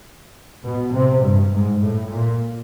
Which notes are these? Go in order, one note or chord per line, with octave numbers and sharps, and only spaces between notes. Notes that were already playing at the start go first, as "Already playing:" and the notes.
B2
C3
G2
G#2
A2
A#2